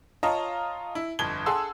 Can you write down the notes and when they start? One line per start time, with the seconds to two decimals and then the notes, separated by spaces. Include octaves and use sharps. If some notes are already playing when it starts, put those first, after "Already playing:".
0.23 F4 C#5 D#5 A5 A#5
0.95 E4
1.19 G1 F2 G#6 G7
1.46 G#4 A4 F#5 A5 C6 E6